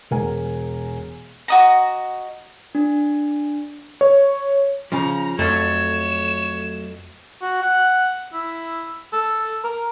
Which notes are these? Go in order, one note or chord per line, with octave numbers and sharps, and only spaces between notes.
E1 A#4 G#5
F#4 D#5 A#5
D4
C#5
C#3 F3 A#5
F2 F#3 A3 C#5 E7
F#4
F#5
E4
A4
A#4